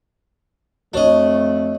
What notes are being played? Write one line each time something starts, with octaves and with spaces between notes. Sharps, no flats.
F2 A3 D4 F#4 C#5 D#5